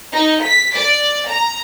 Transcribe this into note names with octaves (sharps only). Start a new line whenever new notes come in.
D#4
B6
D5
A#5